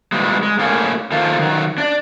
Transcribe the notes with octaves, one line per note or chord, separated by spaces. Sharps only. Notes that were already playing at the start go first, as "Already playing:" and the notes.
A#2 E3 G3 G#3
G#3
A2 A#3 C4 D4 G#4 C#5
D#3 F3 A#3 F4 A4 F5
D#3 F#3
D4 D5